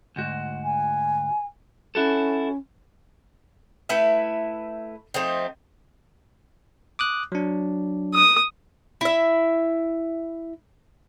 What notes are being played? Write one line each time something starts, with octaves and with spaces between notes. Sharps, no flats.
D2 G#2 F#4
G#5
C#4 E4 F#4 A4
A3 E4 B4 E5
F3 A3 C4 D#4
D6 D#6 F#6
F#3 D4
D#6
E4 E5